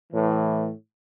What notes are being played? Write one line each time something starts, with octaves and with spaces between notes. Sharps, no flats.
A2 E3